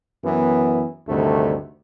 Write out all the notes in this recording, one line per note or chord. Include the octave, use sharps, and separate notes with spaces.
F#2 E3 B3
D2 G2 C3 D#3 A3